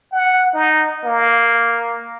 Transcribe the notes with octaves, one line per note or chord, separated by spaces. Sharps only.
F#5
D#4
A#3